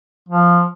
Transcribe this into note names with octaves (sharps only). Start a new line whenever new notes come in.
F3